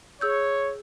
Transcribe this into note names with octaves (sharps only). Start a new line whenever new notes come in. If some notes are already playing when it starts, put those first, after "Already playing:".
G#4 C#5 E6 G6